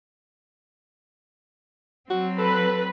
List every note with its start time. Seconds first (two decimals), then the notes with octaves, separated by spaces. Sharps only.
2.10 F#3 C4 F#4
2.39 A4 B4